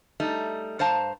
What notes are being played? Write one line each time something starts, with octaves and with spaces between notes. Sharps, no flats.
G3 A3 D#4
G2 C5 F5 A5 A#5